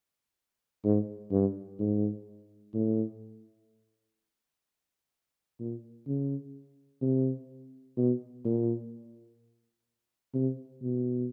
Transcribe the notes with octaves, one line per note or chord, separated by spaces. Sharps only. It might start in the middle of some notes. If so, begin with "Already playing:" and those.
G#2
G2
G#2
A2
A#2
C#3
C3
B2
A#2
C3
B2